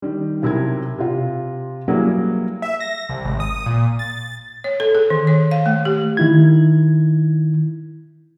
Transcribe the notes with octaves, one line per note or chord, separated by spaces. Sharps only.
D#3 G3
B1 C3 E4 A#4 G#6
C3 F4
F#3 G3 A#3 E4 G#4 B4
E5
A#6
C2
G#1
D#6
A#2
A6
C#5
A4
G#4
D#3
C#5
F5
A3
G4
D#3 E4 G#6